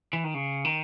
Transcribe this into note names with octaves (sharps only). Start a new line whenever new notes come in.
E3
D#3
C#3
D#3